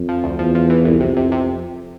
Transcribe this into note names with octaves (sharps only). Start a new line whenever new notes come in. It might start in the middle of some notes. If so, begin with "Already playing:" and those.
Already playing: F2
F3
D2
E2 F3
F3
E3
C2
F2 C3
C3
C3